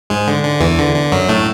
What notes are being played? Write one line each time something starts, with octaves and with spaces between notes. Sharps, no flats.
G#2 G#3
D3
D3
E2 E3
D3
D3
F#2 F#3
A2 A3